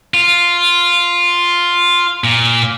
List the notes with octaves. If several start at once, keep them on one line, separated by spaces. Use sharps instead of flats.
F4
A#2